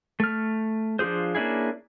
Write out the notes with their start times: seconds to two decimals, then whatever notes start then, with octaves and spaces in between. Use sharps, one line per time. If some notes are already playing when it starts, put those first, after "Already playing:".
0.20 A3 F6
0.99 F3 D4 F4 G#4 C5
1.35 A#3 C#4 D4 E4 G#4